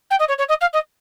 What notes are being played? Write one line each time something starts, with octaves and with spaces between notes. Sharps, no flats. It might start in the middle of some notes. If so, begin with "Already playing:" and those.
G5
D#5
C#5
C#5
D#5
F5
D#5